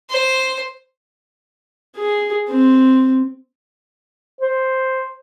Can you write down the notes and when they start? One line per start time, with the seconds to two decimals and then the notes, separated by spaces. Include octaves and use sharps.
0.10 C5
1.97 G#4
2.49 C4
4.41 C5